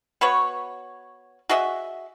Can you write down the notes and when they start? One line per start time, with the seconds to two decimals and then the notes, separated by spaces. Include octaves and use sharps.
0.21 B3 F#4 B4 C#5
1.49 F#4 G#4 D#5 E5